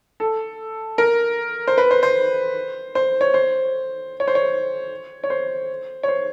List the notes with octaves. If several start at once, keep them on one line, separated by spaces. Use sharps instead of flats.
A4
A#4
C5
B4
C5
C5
C5
C#5
C5
C#5
C5
C#5
C#5
C5
C#5
C5